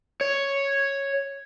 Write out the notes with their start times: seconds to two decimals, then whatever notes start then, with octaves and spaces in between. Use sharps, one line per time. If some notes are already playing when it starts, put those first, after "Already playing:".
0.21 C#5